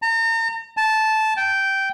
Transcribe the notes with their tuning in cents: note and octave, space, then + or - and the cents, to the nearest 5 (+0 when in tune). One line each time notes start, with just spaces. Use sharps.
A#5 -40
A5 -10
G5 -10